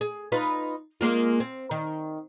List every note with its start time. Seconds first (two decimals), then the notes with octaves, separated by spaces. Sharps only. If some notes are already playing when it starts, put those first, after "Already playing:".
0.01 G#4
0.32 D#4 F4 B4
1.01 G#3 A#3 F4
1.40 C4
1.71 D#3